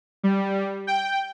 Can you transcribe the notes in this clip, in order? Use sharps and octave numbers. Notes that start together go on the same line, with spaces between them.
G3
G5